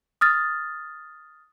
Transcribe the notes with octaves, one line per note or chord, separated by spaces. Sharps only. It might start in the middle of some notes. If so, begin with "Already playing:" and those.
D#6 F6 A6